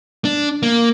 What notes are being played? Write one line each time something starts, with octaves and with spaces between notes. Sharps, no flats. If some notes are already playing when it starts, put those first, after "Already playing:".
D4
A#3